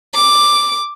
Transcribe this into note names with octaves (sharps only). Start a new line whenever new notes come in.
D6